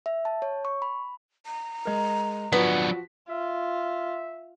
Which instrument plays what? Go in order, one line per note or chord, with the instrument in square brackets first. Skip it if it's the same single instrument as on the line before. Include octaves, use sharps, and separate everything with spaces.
[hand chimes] E5
A5
C#5
C#6
B5
[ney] A#5
[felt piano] G#3 A#4
[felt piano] F3 F#4 B6 [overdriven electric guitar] F#3 D4 [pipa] B3
[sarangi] F4 [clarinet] E5